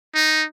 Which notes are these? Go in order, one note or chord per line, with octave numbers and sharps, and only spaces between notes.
D#4